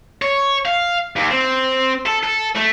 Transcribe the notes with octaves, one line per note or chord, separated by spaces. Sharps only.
C#5
F5
D#2
C4
A4
A4
A3